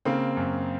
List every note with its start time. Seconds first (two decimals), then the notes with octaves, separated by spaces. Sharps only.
0.05 C#3 A#3 C4
0.37 F#2